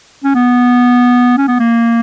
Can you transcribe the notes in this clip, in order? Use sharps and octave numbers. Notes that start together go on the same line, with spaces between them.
C#4
B3
C#4
B3
A#3